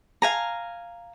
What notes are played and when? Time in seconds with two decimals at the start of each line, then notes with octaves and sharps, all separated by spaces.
0.22 F5 G#5 A#5